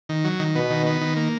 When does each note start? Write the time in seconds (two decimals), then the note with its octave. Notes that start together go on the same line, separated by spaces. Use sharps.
0.09 D#3
0.24 F#3
0.40 D#3
0.55 B2 B3
0.70 D#3
0.87 B3
1.01 D#3
1.17 A#3